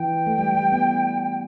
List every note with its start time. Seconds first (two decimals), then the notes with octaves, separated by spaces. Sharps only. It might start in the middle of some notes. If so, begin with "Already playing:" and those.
Already playing: E3 G5
0.27 A3
0.38 G3
0.55 G3
0.72 B3